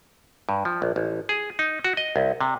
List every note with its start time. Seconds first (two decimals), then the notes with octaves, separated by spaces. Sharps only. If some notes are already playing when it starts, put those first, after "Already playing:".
0.49 G2
0.65 F3
0.82 A#1
0.96 A1
1.29 G#4
1.59 D#4
1.84 F#4
1.97 D#5
2.16 C2
2.41 C3